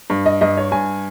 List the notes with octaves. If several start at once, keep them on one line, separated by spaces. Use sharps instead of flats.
G2
D#5
G2 D#5
C#5
G2 G#5